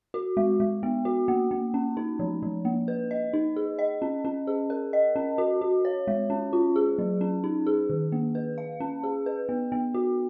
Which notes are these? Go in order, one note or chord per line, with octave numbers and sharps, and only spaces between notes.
F#4
G#3
G#3
B3
F#4
A#3
A#3
C#4
D#4
F3
F3
A#3
B4
D#5
D#4
G#4
D#5
C#4
C#4
G#4
A#4
D#5
C#4
F#4
F#4
C#5
G#3
C#4
F4
G#4
F#3
C#4
D#4
G#4
D#3
A#3
B4
F5
C#4
G#4
B4
B3
B3
F#4